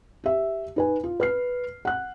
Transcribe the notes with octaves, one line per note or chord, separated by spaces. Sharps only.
G4 E5
D#4 B4 G#5
F4
B4 F6 C7
F#5 F#6